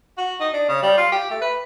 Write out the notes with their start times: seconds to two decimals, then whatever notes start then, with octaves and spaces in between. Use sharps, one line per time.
0.18 F#4
0.40 D#4
0.53 D4
0.68 C#3
0.83 G3
0.97 F4
1.12 G4
1.30 A3
1.42 B4